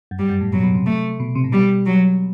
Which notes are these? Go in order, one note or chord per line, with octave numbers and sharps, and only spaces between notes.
F#2
G2 G3
F#2
A2
B2 F#3
B2
C3
A3
B2
C3
A2
B2 G3
F#3